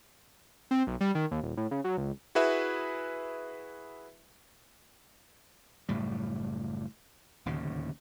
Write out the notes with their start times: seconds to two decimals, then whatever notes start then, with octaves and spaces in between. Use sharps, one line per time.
0.71 C4
0.87 B1
1.01 G3
1.15 D#3
1.31 D#2
1.43 D#1
1.57 A2
1.71 C#3
1.84 F#3
1.98 C#2
2.35 E4 F#4 G#4 B4 E5
5.89 F#1 A2 G3
7.46 D1 D#2 C#3